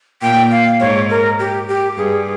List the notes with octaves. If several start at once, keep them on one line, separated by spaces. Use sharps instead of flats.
A#2 G5
F5
G#2 C#5
A#4
G4
G4
G2 G#4